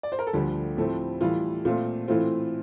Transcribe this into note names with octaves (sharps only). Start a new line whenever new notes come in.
D5
C5
A#4
A4
D2 D3 F3 G3 G4
A2 F3 A3 C4
A2 E3 G3 F4
A#2 A3 C4 F4
A2 E3 A3 C4 F4